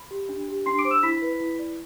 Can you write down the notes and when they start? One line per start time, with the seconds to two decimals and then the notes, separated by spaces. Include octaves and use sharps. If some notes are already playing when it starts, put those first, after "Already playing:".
Already playing: B5
0.11 G4
0.29 D4
0.48 G4
0.66 D4 C6 C7
0.79 D6 D7
0.85 C5
0.91 E6 E7
1.03 E4 B5 B6
1.22 B4
1.40 E4
1.59 D5